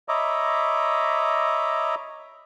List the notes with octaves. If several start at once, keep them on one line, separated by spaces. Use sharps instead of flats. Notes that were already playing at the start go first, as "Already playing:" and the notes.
C#5 D#5 E5 A#5 B5 D6